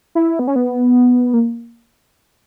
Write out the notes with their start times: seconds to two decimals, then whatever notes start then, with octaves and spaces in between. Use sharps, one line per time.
0.15 E4
0.39 B3
0.47 C#4
0.56 B3
1.34 A#3